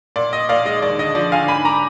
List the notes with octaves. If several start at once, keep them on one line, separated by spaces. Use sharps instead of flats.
A#2 D5
A#2 D#5
A#2 D5 F5
G#3 D#5
D#2 D5
D3 D#5
F3 D5
D3 F5 G#5
G#2 G#5 B5
A#5 D6